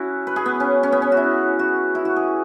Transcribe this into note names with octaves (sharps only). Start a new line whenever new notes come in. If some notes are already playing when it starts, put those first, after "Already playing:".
Already playing: C#4 E4 F#4
B4
G#4
B3
C#4
C#4
B3
C#4
F#4
E4
F#4
E4
F#4
G#4